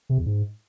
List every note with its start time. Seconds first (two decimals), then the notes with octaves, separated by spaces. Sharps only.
0.09 C3
0.18 E2
0.26 G#2